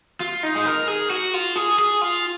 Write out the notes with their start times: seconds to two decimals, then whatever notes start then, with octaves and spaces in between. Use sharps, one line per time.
0.20 F4
0.43 D#4
0.55 G#4
0.65 A#4
0.88 G#4
1.10 F#4
1.34 F4
1.56 G#4
1.79 G#4
2.02 F4